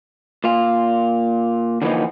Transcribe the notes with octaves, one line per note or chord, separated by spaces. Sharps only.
A#2 F4
D3 E3 F3 A#3 B3 D#4